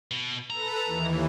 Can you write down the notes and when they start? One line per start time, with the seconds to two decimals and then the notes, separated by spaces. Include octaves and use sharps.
0.11 B2
0.50 A4 B4 A#5
0.85 D#2 E3